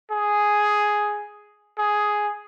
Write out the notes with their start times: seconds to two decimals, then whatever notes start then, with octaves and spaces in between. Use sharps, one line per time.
0.11 G#4
1.78 G#4